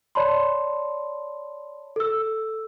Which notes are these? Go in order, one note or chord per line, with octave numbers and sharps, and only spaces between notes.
C#5 D5 A5 B5 C6
A4 E6